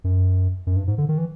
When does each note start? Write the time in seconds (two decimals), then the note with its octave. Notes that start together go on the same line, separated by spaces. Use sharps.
0.04 F#2
0.67 F#2
0.76 G2
0.87 G#2
0.98 D3
1.09 D#3
1.18 E3